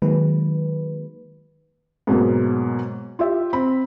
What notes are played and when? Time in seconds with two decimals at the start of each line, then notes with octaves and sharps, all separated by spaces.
0.02 D#3 F#3 G#3 A#3 B4
2.07 G#2 B2 F#3 A#3
3.19 F4 G4 E5
3.53 C4 B5